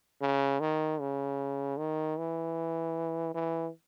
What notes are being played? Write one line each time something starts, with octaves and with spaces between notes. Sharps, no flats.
C#3
D#3
C#3
D#3
E3
E3